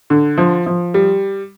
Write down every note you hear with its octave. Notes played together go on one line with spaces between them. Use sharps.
D3
F3
F3
G3